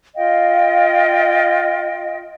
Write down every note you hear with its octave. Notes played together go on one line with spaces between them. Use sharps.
F4 D#5 F5 G5